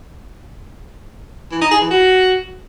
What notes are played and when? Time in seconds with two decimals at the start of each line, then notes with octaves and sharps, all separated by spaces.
1.51 E3
1.61 D#4
1.71 G#4
1.81 E3
1.90 F#4